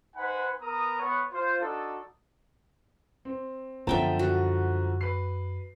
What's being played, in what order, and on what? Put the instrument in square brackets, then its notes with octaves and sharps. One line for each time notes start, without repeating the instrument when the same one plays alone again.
[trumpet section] D#4 B4 C5 F#5 G#5 B5
B3 A#4 A#5 D#6
B3 C#5 F#5
F4 C5
D4 D#4 F#4 A4
[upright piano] C4
[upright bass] F#2 B3 [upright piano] D3 F3 A#5 [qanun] E5 G5 A5
[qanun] F#4
[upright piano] B4 C7